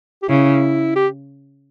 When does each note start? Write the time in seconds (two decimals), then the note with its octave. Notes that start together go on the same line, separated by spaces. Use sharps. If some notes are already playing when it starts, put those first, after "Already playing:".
0.22 G4
0.29 C#3 E4
0.96 G4